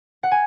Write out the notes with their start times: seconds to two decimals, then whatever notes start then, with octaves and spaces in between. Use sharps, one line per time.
0.23 F#5
0.31 G#5